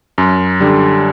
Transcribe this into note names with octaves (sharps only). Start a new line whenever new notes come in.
F#2
D3 G3